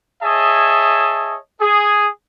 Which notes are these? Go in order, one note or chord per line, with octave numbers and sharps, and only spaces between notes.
G#4 C#5 D#5 E5 A5
G#4